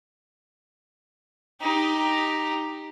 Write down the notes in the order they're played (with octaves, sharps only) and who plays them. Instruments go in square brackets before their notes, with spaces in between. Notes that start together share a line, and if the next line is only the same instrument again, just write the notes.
[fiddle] D#4 G4